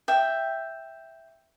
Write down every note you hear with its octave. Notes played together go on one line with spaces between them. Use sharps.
E5 G5